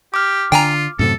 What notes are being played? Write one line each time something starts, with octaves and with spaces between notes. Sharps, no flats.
G4 D6 F6
D3 F4 G5 G#5 A#5
F#2 A2 C3 A4